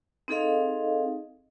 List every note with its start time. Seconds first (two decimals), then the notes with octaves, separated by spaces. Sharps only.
0.28 C4 D#4 G#4 A4 D#5 F5